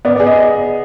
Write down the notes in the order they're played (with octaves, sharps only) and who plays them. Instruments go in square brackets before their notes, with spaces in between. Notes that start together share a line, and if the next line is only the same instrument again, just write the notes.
[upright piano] B3 [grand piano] D5
[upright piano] G#4 [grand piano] D5
[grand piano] D#5